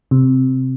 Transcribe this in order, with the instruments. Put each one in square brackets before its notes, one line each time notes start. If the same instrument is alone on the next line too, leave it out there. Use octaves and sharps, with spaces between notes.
[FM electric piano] C3